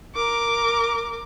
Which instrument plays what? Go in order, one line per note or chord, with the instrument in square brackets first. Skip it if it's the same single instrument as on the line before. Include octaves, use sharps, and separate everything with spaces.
[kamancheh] A#4 D6